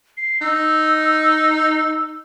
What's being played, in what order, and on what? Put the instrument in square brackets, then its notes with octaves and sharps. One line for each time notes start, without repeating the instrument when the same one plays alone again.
[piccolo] C7
[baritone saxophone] D#4 [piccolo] E6